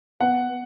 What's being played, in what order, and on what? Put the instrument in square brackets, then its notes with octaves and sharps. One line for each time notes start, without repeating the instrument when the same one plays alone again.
[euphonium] B3 [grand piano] F#5